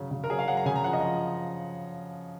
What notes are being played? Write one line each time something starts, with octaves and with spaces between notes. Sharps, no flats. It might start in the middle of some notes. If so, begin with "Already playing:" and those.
Already playing: C#3 F#3
C#3
A#4
F#3 G#4
F5
F#3 F#5
A#5
C#3 G#5
A#5
F3 F#5
D#5
F3